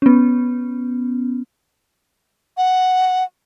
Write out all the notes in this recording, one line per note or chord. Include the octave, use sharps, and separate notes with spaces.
B3 C#4
F#5